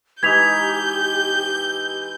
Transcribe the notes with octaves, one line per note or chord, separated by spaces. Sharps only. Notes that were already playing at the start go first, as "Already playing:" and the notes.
E3 G#3 D#4 G4 G6 G#6 B6 F7